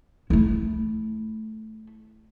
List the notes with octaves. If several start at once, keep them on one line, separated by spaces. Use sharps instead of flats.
A3 E4